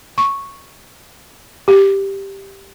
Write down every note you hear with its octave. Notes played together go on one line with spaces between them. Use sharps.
C#6
G4